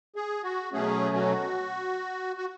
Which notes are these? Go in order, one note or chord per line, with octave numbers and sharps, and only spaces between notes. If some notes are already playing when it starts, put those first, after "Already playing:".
G#4
F#4
B2 F#3 A3 C#4 G#4
F#4
F#4